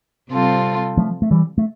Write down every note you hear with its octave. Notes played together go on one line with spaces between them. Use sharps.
C3 G3 C4 F4 A4
F3 A3
A3
E3 G3
A3